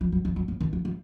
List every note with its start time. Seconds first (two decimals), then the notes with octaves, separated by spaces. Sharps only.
0.01 F3
0.12 F#3
0.25 F3
0.36 F#3
0.48 F3
0.61 D#3
0.73 F3
0.85 F3